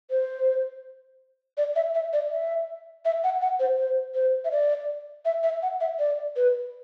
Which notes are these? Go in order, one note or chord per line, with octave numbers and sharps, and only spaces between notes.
C5
D5
E5
E5
D5
E5
E5
F#5
F#5
C5
C5
C5
E5
D5
E5
E5
F#5
E5
D5
B4